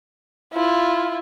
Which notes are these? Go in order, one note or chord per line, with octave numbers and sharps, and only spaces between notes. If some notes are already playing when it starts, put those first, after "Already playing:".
E4 F4